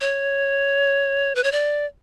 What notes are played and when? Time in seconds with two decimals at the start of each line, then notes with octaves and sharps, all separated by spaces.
0.01 C#5
1.35 B4
1.44 C#5
1.52 D5